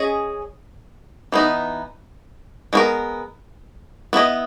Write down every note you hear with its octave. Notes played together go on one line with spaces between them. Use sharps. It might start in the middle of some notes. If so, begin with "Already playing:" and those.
Already playing: C#4 G#4 D#5
E3 B3 D#4
G#3 B3 F#4 A#4
B3 E4 A#4 D#5